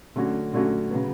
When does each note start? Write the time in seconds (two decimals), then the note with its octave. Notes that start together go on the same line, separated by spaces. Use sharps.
0.16 D3 F#3 A3 C#4 F#4
0.53 D3 F#3 A3 C#4 F#4
0.91 C#3 F#3 B3